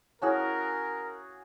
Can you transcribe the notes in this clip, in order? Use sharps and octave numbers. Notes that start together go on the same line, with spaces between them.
C#4 E4 F#4 G#4 A#4 C#5 A5